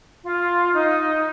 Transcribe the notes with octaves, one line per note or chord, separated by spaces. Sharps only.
F4
D#4